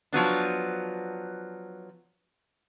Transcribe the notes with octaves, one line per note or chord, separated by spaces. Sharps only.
F3 F#3 B3 D4